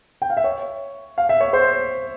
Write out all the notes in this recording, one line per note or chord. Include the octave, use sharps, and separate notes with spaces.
G5
F5
E5
C#5
F5
E5
C#5
C5